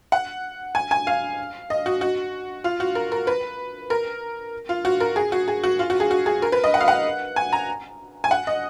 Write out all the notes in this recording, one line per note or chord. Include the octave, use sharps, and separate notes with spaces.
F#5
G#5
G#5
F5
D#5
F#4
F#4
F4
F#4
A#4
A#4
B4
A#4
F4
F#4
A#4
G#4
F#4
G#4
F#4
F4
F#4
G#4
F#4
G#4
A#4
B4
D#5
F#5
F5
F#5
G#5
A#5
G#5
F#5
D#5